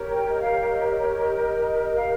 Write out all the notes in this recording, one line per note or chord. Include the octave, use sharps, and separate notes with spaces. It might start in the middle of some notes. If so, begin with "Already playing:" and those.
Already playing: G4 A#4 C#5
G5
D#5
F5
D#5
D#5
C#5
C#5
D#5
D#5
D#5
D#5
F5